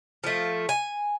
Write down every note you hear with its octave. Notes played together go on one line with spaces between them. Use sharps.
F3 A3
G#5